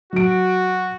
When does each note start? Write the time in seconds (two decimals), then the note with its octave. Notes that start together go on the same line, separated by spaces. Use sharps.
0.13 F#3 F#4 D7